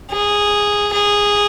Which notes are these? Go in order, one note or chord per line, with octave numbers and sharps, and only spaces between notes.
G#4
G#4